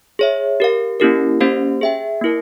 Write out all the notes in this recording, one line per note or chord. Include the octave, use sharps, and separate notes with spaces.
G#4 C#5 E5
G4 A#4 F5
A#3 C#4 E4 G4 A#4
A#3 C#4 G4 C5 F5
G#4 E5 G5
A#3 E4 A#4